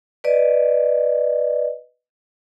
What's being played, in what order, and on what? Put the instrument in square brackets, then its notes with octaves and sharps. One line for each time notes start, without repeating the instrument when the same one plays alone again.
[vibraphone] B4 D5 D#5